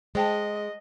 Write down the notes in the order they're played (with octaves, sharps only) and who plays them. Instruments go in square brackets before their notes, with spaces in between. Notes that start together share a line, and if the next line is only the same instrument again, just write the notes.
[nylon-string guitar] G#3 [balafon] C5 G5 A5 [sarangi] D#5